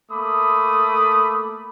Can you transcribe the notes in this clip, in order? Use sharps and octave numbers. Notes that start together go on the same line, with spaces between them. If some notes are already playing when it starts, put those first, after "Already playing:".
A3 A#3 B5 D6 D#6